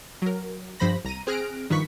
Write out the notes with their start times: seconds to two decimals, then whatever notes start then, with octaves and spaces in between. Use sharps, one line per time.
0.22 F#3 A#4
0.80 G2 F3 C5 B5 A#6
1.04 C2 A#5 A#6 D#7
1.27 C4 G#4 F6 F#6 A#6 D7
1.70 G2 D#3 F3 B4 C#6 B6